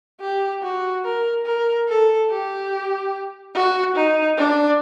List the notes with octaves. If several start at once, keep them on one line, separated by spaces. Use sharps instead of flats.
G4
F#4
A#4
A#4
A4
G4
F#4
D#4
D4